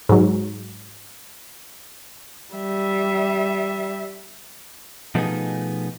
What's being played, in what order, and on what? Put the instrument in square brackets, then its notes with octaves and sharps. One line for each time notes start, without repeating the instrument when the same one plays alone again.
[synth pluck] G#2 F#3
[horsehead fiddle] G3 E5
[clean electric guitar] B2 F3 A3 B3 D#4 G#4